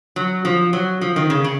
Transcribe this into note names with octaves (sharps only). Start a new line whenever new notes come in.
F#3
F3
F#3
F3
D#3
C#3
C#3